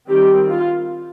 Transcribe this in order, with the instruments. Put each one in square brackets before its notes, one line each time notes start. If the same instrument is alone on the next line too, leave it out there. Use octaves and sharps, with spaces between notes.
[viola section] D#3 G3 C4 G4
F4